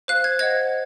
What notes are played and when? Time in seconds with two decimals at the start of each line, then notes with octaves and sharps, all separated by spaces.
0.08 C5 F5 F#6
0.24 G#6
0.39 C5 D#5 F#5 G#6